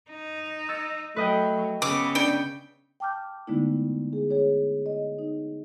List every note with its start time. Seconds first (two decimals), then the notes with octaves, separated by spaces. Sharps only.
0.11 D#4
0.69 E6 A6 C#7
1.16 F#3 A3 B4 D#5 G5
1.82 C#3 B3 D6 E6
2.15 D4 G5
3.00 G5 A5 D6 F6 G6
3.47 D3 G#3 A3 B3 D#4 E4
4.13 G#4
4.31 G#4 C#5
4.86 D#5
5.19 D#4